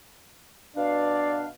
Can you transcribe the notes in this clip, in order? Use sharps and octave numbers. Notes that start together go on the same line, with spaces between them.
B2 D4 D5 F5